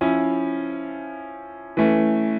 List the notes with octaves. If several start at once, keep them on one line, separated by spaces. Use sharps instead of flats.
F3 C#4 E4
E3 A3 C#4